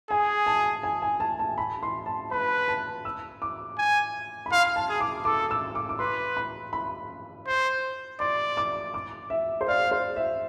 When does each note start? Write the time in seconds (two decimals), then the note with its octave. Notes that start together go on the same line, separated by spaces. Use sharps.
0.10 G#4 G#5
0.46 A5
0.83 G#5
1.02 G#5
1.20 A5
1.39 A5
1.58 B5
1.83 C6
2.06 A5
2.31 B4 B5
2.68 A5
3.05 E6
3.42 D6
3.78 G#5
4.46 B5
4.52 F5 C6
4.76 A5
4.89 G#4
5.01 D6
5.25 A4 D6
5.51 E6
5.75 D6
5.89 D6
5.99 B4 C6
6.37 B5
6.73 B5
7.47 C5
8.20 D5 C6
8.57 D6
8.94 D6
9.30 E5
9.61 C5
9.68 D5 F5
9.91 C5
10.16 E5